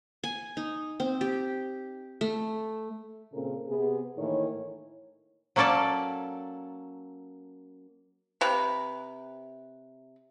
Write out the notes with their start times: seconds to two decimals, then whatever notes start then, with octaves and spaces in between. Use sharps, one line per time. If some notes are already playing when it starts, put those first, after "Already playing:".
0.24 G#5
0.57 D#4
1.00 C4
1.21 G4
2.21 A3
3.32 A#2 C#3 C4 C#4 A4 A#4
3.67 C3 B3 G#4
4.17 A2 D#3 E3 A#3 C#5
5.56 F#3 A#3 C#4 A4 D5 A5
8.41 C3 B4